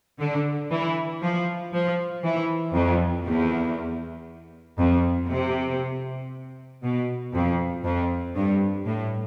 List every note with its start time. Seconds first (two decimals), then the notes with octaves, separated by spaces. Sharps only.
0.20 D3
0.71 E3
1.23 F3
1.73 F3
2.24 E3
2.75 F2
3.26 E2
4.79 F2
5.29 C3
6.83 B2
7.34 F2
7.84 F2
8.35 G2
8.86 A2